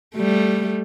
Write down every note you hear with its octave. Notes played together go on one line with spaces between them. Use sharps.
G3 A3